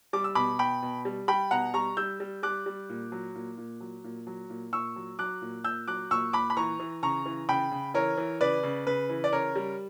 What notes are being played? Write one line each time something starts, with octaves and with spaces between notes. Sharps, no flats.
G3 D6
E6
B2 B5 D6
B2 G5 B5
B2
G3
G3 G5 B5
B2 F#5 A#5
G3 A#5 C#6
G3 E6 G6
G3
G3 D6 F#6
G3
A#2
F#3
A#2
A#2
F#3
A#2
F#3
A#2
A#2 C#6 E6
F#3
F#3 D6 F#6
A#2
A#2 E6 G6
F#3 D6 F#6
A#2 C#6 E6
A#2 B5 D6
B5
E3 A#5 C#6
E3
C#3 A#5 C#6
E3
C#3 G5 B5
C#3
E3 A#4 C#5
E3
C#3 B4 D5
C#3
C#3 B4
E3
D5
C#3 A#4 C#5
G3